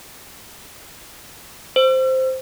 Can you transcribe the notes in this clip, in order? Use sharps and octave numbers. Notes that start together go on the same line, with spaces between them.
C5